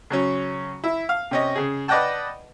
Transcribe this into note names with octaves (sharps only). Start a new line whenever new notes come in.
C#3 F#3 C#4
E4
F5
C3 C#4 D#5
C#3 G#4
B4 D5 D#5 F#5 G5 A5